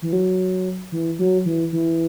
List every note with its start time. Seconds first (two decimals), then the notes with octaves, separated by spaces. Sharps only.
0.02 E3
0.13 F#3
0.92 E3
1.19 F#3
1.46 E3
1.72 E3